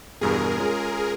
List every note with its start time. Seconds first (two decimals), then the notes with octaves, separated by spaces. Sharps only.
0.21 E2 G2 B2 G#4 A#4
0.58 G#3 C#4 F4